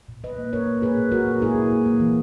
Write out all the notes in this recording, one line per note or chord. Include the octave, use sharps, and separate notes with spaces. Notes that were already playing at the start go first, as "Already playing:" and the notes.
A#2
A#2 B4 D#5
A#3
A#3 A#4 C#5
A#3
A#3 G#4 B4
A#2
A#2 F#4 A#4
A#3
A#3 E4 G#4
A#3
A#3
A#3
E3